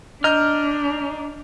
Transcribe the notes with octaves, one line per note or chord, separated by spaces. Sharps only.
D4 D#5 A#5 F6 G6